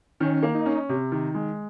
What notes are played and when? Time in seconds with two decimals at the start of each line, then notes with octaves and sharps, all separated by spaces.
0.20 D#3 C#4
0.43 A#3
0.55 D#4
0.66 C#4
0.89 C3
1.12 D#3
1.35 G#3